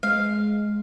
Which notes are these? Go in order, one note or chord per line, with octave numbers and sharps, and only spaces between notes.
G#3 F5